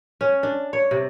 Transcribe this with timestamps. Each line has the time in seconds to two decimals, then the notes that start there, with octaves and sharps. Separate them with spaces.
0.21 C#4
0.43 D4
0.73 C#5
0.91 C3